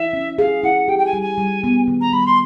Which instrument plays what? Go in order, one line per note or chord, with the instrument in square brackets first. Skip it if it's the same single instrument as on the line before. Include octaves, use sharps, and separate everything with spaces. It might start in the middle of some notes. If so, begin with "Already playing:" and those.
Already playing: [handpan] E4 [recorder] E5
[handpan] C#4
[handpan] G#4 [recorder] F5
[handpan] E4 [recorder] F#5
[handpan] G4 [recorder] G5
[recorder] G5
G#5
[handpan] G3
[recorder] G#5
[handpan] G3
B3
D#3
[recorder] A#5
[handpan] G3 [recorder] B5
[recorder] C6